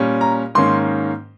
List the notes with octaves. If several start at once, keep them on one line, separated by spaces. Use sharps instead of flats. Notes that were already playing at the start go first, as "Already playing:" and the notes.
Already playing: A#2 G3 C#4
A#5
G#2 D#3 A#3 C#4 C6